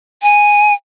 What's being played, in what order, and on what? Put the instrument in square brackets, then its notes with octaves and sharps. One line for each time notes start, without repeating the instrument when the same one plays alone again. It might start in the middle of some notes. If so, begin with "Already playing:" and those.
[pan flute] G#5